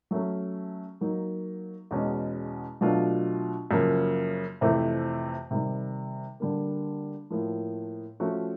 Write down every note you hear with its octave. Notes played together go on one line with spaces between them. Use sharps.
F#3 A3 C#4
F#3 A#3 D#4
E2 B2 G#3 C#4
B2 F#3 A3 D4 F4
F#2 C#3 F3 A#3
F2 C3 E3 A3
C3 D#3 G3
D3 G3 A#3
A2 F3 A#3
F3 A3 C#4 F#4